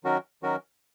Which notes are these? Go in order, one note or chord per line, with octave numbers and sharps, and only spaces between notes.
D#3 F#3 C#4 F#4 A#4
D#3 F#3 C#4 F#4 A#4